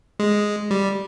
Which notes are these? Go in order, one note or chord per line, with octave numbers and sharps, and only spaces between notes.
G#3
G3